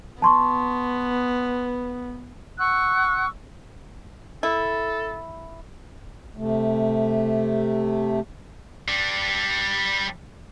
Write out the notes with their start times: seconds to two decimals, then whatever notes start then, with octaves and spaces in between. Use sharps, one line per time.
0.22 B3 A5 C6 C#6
2.59 F#5 C#6 E6 F#6
4.43 E4 A4
6.37 C3 A3
8.88 G3 D4